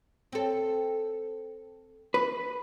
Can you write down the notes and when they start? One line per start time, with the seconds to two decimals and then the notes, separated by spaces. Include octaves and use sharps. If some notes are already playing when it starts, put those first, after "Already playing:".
0.32 C4 A4
2.14 B4